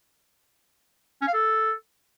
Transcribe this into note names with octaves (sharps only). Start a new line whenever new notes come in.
C#4
F5
A4